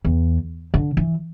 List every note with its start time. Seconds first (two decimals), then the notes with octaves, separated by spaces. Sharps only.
0.05 E2
0.74 D3
0.97 E3